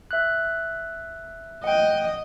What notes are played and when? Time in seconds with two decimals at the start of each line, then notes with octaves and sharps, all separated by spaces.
0.11 E5 F#6
1.64 D#5 F#5 G5